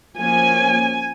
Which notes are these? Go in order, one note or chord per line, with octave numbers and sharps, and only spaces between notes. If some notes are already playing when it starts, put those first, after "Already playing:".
F3 A#3 C#4 G#5